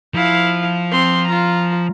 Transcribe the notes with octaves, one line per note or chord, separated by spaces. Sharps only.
F3 E4 F5
C4 C6
F4 A#5